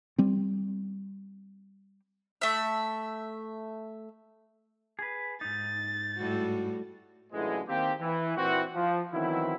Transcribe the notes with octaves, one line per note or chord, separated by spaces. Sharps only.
G3 C4
A3 E5
G#4 B4
G#2 D#4 A6
A2 G3 F#4
F#2 A2 D3 E3 F3 G#3
D#3 A#3 C4 G4
E3
A#2 E3 C4 F#4
F3
D#3 E3 F#3 B3 C4 E4